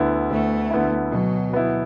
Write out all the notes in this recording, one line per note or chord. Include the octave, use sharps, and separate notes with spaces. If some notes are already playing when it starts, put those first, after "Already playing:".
Already playing: D2 D3 B3 E4
D2 A3
D3 B3 E4
B2 F#3
B3 E4